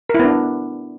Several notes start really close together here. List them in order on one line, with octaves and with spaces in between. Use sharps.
A#4 E4 B3 D4